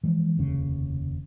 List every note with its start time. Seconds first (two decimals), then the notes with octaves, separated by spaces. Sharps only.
0.04 E3 F3 G#3
0.37 F1 D#2 C#3 C#4